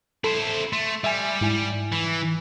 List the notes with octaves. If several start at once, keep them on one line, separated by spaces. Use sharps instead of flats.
E4 A4 C5
A3 C6
G3 E5 G#5
G#2 E4 G#5
E3